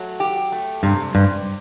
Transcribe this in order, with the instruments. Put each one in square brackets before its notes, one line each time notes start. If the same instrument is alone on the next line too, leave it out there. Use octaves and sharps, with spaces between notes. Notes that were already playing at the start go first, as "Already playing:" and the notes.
Already playing: [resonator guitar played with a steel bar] F#3 A3
G4
A3
[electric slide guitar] G2 [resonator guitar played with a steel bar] C3
[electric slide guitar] G2 [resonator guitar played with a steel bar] C3